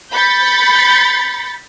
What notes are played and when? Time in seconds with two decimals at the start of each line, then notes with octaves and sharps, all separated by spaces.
0.12 B5 G6 A6 B6 C#7